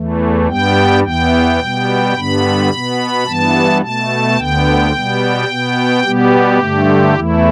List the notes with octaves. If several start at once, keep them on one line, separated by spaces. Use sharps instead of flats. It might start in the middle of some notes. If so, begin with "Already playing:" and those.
Already playing: E2 E3 A3
G2 G3 B3 G5
E2 E3 B3 G5
B2 G3 B3
G2 D3 G3 B3 B5
B2 B3
G2 E3 B3 A5
B2 A3 A5
D2 D3 B3 G5
B2 G3 B3
B2 B3
B2 G3 B3 G4
G2 D3 A3
E2 E3 A3 E4